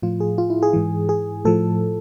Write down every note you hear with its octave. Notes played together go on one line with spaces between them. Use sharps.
A2 F3 F4
G#4
F4
E4
G#4
G#2 E3
G#4
A2 F3 A4